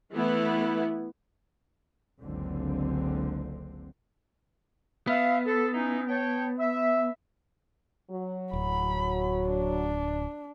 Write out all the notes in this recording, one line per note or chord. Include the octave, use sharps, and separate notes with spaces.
E3 A3 B3 E4
F#1 C#2 D3 C4
B3 E5 F5
A4
C#4 D#4 E4
C#5 G5 A5
E5
F#3
D1 B5
D4